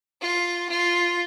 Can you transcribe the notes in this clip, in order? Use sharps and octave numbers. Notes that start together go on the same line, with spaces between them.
F4
F4